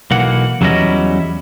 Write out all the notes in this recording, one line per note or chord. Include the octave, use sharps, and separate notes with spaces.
B1 E3 A#3 F#5
E2 F#3 G3 C#4 E4 D#5